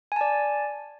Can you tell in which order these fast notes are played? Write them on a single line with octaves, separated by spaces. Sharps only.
G#5 A5 D5